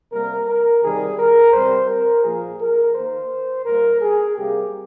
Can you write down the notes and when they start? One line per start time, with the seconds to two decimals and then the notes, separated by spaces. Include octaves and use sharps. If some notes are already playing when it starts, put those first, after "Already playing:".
0.12 C3 G3 A#3 A#4
0.48 A#4
0.83 C3 D#3 G3 G#4
1.19 A#4
1.53 C3 G3 C4 C5
1.90 A#4
2.24 A#2 F3 A#3 G#4
2.60 A#4
2.94 D#3 A#3 C5
3.65 A#2 G3 A#3 A#4
4.01 G#4
4.36 C3 G3 A#3 G4